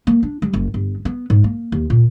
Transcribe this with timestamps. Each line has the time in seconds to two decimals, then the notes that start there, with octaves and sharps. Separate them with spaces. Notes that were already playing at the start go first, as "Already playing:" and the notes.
0.07 A#3
0.23 D4
0.42 G3
0.53 F#1
0.74 G1
1.05 B3
1.30 G#2
1.44 A#3
1.72 D#2
1.90 A#2